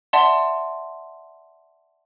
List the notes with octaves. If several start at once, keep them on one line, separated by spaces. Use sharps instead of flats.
D5 E5 F#5 A5 C6